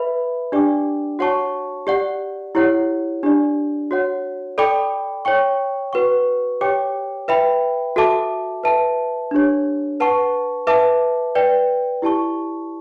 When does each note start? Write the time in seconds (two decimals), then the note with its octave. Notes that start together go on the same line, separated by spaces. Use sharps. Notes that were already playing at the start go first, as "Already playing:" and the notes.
Already playing: B4 E5 B5
0.52 D4 G4 D5 G5 D6
1.19 F#4 C#5 F#5 A5 C#6
1.87 G4 D5 F#5
2.55 E4 G4 C#5 F#5
3.23 D4 G4 D5
3.91 F#4 C#5 F#5
4.58 A4 D5 G5 B5 D6
5.25 C#5 G5 C#6
5.93 F#4 B4 F#5 C#6
6.61 G4 C#5 G5 D6
7.28 B4 E5 G5 B5
7.96 F#4 A4 E5 A5 D6
8.64 B4 E5 A5
9.31 D4 G4 C#5
10.00 B4 F#5 A5 C#6
10.67 B4 E5 A5 D6
11.35 B4 D5 G5
12.02 E4 G4 D5 A5 C#6